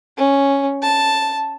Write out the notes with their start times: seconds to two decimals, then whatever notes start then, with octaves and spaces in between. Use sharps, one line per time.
0.17 C#4
0.82 A5